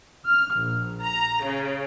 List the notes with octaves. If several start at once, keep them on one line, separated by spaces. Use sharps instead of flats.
F6
A#1
A#5
C#3